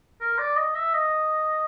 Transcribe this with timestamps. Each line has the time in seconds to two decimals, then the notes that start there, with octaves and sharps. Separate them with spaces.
0.21 A#4
0.38 D5
0.56 D#5
0.75 E5
0.93 D#5